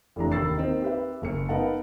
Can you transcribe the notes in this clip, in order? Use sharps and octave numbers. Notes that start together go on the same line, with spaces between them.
F1 E3 D4 A#5
D#2 A#3 B5 E6 A6 C7
A#3 C4 D#4
G4 B4 E5
F#1 A#4 C#7
B3 D#4 A#4 F5 F#5 A5